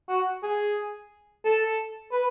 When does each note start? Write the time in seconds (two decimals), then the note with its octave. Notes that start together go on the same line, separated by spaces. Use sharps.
0.09 F#4
0.43 G#4
1.45 A4
2.12 B4